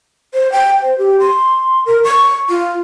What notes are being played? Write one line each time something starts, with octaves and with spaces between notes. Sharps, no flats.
C5
G5
C5
G4
C6
A#4
C#6
F4